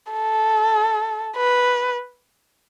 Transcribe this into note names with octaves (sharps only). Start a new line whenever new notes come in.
A4
B4